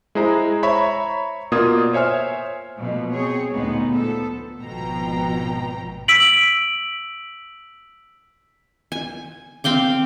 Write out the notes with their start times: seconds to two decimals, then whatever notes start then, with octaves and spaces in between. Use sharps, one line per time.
0.15 G#3 E4 G#4 C5 A#5
0.63 C5 C#5 E5 A#5 B5 C#6
1.52 B2 A#3 F4 D5 D#6 G#6
1.93 C5 C#5 E5 G#5 F6
2.79 B2 F3 A3 A#3
3.10 C4 G#4 C#5
3.53 D2 A#2 G#3 B3 D#4
3.93 F3 B3 A4
4.59 G#1 B2 F3 G5 A#5
6.08 E6 B6 D7 F#7
8.92 G#5
9.64 C4 F5 G5 D6